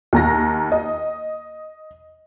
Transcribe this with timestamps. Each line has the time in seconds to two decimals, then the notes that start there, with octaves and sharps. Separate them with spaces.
0.13 D#2 A#5 A#6
0.72 D#5